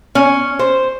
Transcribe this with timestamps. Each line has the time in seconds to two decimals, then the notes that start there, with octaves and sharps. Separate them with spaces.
0.15 C#4
0.59 C5